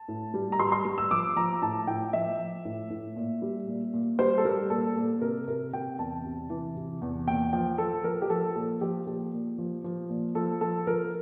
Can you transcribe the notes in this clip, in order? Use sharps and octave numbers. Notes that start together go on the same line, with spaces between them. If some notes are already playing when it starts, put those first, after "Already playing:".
Already playing: A5
A2
G3
A#5
G3 C6
C6
G3
E6
F3 D6
F3 A#5
A2 A5
A2 G5
F3 E5
F3
A2
A2
A#2
G3
A#2
A#2
G3 C5
A4
G3 A#4
A#2 A4
A#2 A4
C3 A#4
C3 A#4
C3 G5
E2 A5
C3
E3
C3
E2
A#2 G5
F3 G5
F3 A4
F3 A#4
G4
F3 A4
A#2 A4
F3 G4
A#2 G4
A#2
F3
F3
A#2
F3 A4
F3 A4
F3 A#4